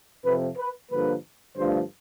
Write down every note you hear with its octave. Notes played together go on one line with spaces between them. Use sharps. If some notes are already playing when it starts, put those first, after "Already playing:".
F2 C3 F3 B4
B4
G2 D3 F3 A#3 B4
G2 D3 F3 A3 C5